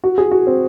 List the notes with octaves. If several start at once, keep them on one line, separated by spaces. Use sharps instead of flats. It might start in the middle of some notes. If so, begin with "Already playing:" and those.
F#4
G#4
F#4
C4